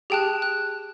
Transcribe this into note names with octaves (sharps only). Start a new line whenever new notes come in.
G4 G#4 G5 A5 F#6
F#6